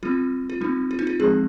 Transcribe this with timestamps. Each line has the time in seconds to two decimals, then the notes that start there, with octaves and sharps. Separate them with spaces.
0.03 G3 C4 F4
0.50 F4
0.61 G3 C4 D#4
0.91 F4
0.99 D#4
1.07 F4
1.19 F3 G#3 C4 G#4